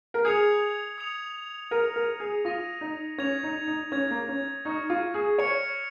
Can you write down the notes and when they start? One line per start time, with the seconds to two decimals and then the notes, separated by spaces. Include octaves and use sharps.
0.14 A#4
0.25 G#4 D#6 G#6 C#7 F7
0.98 D#6 G#6 C#7 F7
1.71 A#4 D#6 A#6 D#7
1.96 A#4
2.20 G#4
2.45 F4 D#6 A#6 D#7
2.81 D#4
3.18 C#4 G#6 F7
3.43 D#4
3.67 D#4
3.92 C#4 G#6 F7
4.10 A#3
4.29 C#4
4.65 D#4 C#6 F6 C#7 F7
4.90 F4
5.14 G#4
5.38 C#5 C#6 F6 C#7 F7